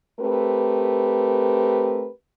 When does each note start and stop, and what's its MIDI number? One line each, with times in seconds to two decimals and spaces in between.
0.20 2.09 57
0.20 2.09 60
0.20 2.09 67
0.20 2.09 70
0.20 2.09 71